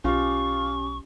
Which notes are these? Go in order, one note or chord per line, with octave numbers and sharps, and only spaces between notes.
B1 C#4 F4 G4 C#6